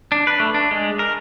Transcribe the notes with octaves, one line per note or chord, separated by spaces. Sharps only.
D4
B4
A3
D4
G#3
A#4